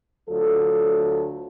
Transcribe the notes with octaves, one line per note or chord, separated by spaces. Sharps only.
D2 F#3 F4 A4